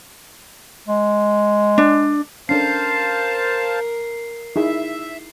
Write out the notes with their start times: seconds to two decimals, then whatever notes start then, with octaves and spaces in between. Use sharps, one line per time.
0.88 G#3
1.78 D4
2.49 C#4 D4 A4 A#4 C5 F5 A5 C7
4.56 D#4 E4 G#4 E5